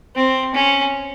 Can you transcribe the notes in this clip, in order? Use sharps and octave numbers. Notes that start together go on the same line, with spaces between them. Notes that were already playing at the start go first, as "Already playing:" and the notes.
C4
C#4